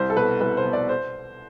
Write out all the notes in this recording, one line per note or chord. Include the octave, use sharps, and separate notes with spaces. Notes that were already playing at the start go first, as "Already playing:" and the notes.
Already playing: C2 C5
A4
B2 B4
C2 B4
C5
B2
D5
C5